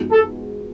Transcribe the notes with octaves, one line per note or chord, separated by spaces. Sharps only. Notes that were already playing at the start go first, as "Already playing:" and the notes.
Already playing: F3 G#3 B3 D#4 F#4
A4